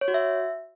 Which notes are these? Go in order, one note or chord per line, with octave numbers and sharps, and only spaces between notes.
C#5
F#4
E5